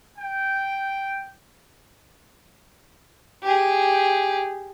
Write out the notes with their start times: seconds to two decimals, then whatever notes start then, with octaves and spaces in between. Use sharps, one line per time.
0.18 G5
3.43 G4 G#4